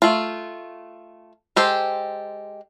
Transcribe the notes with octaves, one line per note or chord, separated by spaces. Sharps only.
A3 F4
G#3 G4 A4 C5